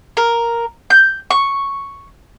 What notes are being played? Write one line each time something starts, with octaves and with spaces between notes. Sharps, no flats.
A#4
G6
C#6